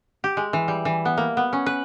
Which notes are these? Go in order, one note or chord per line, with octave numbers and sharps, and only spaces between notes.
G4
G#3
E3
G3
E3
B3
A#3
B3
C#4
B4